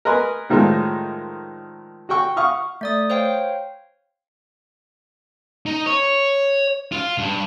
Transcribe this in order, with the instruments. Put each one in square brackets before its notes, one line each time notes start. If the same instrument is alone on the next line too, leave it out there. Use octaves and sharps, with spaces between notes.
[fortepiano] A#4 B4 D#5 G#5 C6
A2 D#3 F3 G3 G#3
F#4 F#5 G5 C#6
F5 F#5 C#6 D#6 F6
[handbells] A3 D5 D#6
C5 C#5 F5 G5
[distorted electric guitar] D#4
C#5
F4 F5
G2